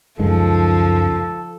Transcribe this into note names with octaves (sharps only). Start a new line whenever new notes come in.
C#2 F#2 D#3 F3 G#3 A4